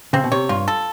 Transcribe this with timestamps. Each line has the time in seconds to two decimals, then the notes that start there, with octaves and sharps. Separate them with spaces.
0.13 C#3 C4
0.24 B2
0.31 C3 C#5
0.49 G2 F4
0.68 A4